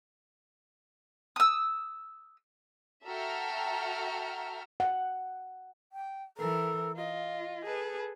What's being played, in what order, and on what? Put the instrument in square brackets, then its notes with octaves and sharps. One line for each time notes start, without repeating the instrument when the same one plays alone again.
[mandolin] D#6 E6
[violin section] F#4 A4 E5 G5 A#5 F6
[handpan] F#5
[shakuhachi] G5
[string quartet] E3 A#4 [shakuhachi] A4
[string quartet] F4 [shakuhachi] D#5
[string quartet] G#4 A4 B4